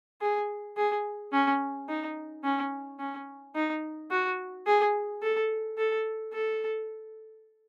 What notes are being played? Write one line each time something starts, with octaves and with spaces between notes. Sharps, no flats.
G#4
G#4
C#4
D#4
C#4
C#4
D#4
F#4
G#4
A4
A4
A4